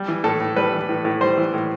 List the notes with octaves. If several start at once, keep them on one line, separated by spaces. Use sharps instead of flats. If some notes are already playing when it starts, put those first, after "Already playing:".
Already playing: G3
E3
A2 A4
A2
G3 B4
E3
A2
A2
G3 C5
E3
A2